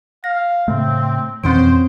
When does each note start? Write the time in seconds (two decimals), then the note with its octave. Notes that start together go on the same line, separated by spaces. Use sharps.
0.24 F5 A#6
0.68 A2 C#3 A3 C4
1.44 F2 B2 E3 C4 C#4 C5 D7